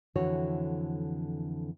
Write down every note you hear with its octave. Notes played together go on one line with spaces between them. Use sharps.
F2 D3 E3 F#4 C#5